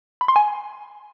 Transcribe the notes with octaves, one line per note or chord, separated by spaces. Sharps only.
B5
C6
G#5